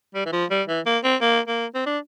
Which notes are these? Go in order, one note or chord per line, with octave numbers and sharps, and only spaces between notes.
G3
E3
F3
G3
E3
A#3
C4
A#3
A#3
C4
D4